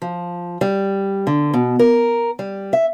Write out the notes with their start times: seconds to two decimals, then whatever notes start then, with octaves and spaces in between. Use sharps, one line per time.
0.02 F3
0.61 G3
1.27 D3
1.54 B2
1.79 A#4
2.39 G3
2.73 E5